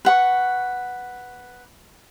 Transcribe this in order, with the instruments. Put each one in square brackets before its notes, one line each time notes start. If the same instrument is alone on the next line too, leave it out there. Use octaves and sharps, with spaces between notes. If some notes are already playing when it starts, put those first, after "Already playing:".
[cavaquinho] B4 F#5 C#6